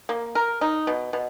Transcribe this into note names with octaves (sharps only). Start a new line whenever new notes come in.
A#3
A#4
D#4
B2
B2